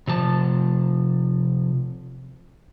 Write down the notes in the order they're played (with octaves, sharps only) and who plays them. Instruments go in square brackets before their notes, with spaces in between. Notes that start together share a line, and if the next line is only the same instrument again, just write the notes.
[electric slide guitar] C3 F3 A5